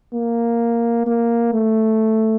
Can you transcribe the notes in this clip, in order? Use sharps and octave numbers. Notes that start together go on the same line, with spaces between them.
A#3
A#3
A3